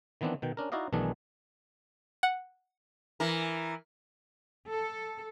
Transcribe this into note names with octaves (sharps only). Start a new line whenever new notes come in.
D#3 E3 B3 C4 D4
B2 D#3 G5
C#4 D4 A#4
D#4 E4 F#4 D5 D#5 F5
B1 D#3 E3 A3 D4 G#4
F#5
E3 A#4
A4